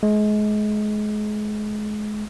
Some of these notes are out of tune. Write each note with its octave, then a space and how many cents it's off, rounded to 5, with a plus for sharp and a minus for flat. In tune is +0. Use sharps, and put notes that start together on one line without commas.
G#3 +30